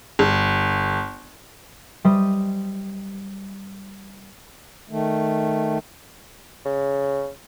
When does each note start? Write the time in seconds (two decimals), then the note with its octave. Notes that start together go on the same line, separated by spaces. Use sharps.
0.19 G1
2.04 G3 C5 D#5
4.90 D#3 A3
6.66 C#3